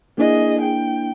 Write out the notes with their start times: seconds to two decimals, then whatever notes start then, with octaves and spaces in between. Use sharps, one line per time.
0.18 A#3 D4 E4 G#4 D#5
0.61 G5